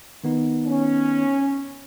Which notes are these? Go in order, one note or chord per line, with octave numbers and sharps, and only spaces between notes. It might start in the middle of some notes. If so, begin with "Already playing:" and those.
D#3 B3 D#4
C#4